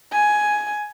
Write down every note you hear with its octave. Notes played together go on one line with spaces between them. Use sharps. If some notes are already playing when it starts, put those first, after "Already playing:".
G#5